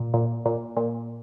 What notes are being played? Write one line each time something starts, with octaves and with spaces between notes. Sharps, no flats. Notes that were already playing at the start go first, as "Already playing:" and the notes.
Already playing: A#2
A#2
A#2
A#2